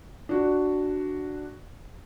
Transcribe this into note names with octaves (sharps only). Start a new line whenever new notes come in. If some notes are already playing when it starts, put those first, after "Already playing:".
D4 F#4